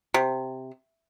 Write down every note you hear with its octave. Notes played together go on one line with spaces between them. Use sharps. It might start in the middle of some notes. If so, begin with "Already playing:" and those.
C3